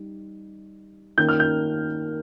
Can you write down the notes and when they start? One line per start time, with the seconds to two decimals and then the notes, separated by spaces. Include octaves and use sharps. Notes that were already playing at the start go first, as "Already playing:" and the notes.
Already playing: G3 D#4
1.18 D#3 A#3 C#4 G6
1.29 F6
1.40 G6